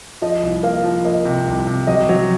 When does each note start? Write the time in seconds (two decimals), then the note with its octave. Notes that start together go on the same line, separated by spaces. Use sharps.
0.22 F3 D#5
0.43 C2
0.63 A#3 F5
0.84 F3
1.05 A#3 D#5
1.25 C3
1.47 C2
1.67 C3
1.87 F#3 D#5
2.09 F#3